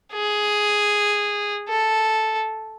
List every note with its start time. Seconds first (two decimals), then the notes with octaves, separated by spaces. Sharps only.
0.13 G#4
1.69 A4